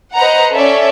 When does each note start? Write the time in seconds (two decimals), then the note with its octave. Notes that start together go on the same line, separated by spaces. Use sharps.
0.16 B4 C5 D#5 F#5 A#5
0.52 C#4 A4 C#5 D5 E5